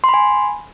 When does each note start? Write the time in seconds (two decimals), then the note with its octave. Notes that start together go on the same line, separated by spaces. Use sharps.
0.04 C6
0.09 B5
0.14 G#5